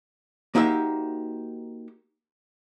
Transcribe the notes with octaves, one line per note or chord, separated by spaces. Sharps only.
A#3 D#4 F#4 G4 C5 E5